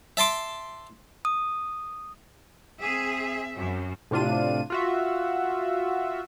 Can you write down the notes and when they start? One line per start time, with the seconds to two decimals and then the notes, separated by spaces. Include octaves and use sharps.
0.17 E5 A5 C6 D6
1.25 D#6
2.81 C4 G#4 E5
3.55 F#2
4.11 A2 C3 D4 F4 D#7
4.70 F4 F#4 E5